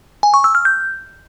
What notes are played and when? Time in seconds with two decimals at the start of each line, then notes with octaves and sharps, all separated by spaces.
0.23 G#5
0.34 C#6
0.44 E6
0.55 F6
0.65 G6